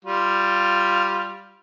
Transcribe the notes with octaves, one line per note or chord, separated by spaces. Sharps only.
G3 F4